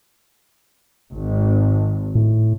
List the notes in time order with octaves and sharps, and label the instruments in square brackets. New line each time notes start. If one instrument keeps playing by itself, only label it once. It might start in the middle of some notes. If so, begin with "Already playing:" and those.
[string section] G#1
[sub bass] A2